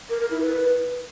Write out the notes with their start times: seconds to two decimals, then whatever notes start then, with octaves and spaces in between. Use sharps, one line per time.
0.10 A#4
0.20 A#4
0.31 E4
0.41 B4